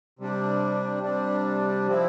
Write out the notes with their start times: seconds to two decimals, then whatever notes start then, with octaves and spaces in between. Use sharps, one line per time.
0.19 C3 G3 D4
1.03 C3 G3 D4
1.87 F3 C4 E4